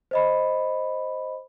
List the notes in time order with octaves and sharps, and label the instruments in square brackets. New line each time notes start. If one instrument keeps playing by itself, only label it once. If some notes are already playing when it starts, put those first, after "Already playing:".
[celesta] C5 D#5 B5